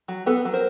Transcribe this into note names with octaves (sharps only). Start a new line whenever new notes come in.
F#3
B3 A4 B4
F#3
A#4 C5